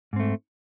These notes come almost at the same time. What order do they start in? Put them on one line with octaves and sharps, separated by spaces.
G#2 C4 A3